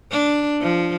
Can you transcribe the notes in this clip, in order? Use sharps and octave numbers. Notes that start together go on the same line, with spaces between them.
D4
F3